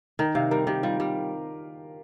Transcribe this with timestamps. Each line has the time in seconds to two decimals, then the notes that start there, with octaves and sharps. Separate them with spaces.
0.19 D#3 A#4
0.35 C3 F5
0.51 G3 A#4
0.67 D#3 G4
0.83 G3 F4
1.00 G3